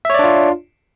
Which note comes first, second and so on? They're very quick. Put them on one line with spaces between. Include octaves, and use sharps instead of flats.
E5 C#5 D5 D4 F4